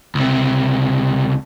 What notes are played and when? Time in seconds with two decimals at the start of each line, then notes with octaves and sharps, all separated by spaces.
0.15 C#2 C3